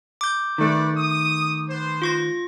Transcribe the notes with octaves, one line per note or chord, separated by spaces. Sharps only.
D6 G6
D#3 A3 B4 D5
D#6
B3 C5
F4 C#6 A#6